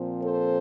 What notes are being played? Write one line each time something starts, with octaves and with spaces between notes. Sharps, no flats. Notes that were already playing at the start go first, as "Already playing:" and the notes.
Already playing: A#2 F3 C4
A4 C5